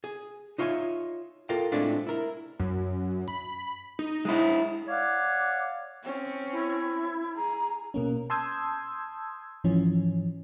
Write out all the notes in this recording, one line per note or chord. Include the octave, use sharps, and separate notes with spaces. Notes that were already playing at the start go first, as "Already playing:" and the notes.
G#4
D#4 F4 C#5 E5 G5 G#5
F4 A4 A#4 F5 G5
A2 G#3 A3 C4 D4 F4
E4 A#4
F#2
B5
D#4
G#3 E4
C#5 D5 F5 F#5 D6
C4 C#4
E4
G#4 A#5
B2 A#3 C#4
A5 C6 D#6 E6 G6 G#6
G#2 E3 F3 C#4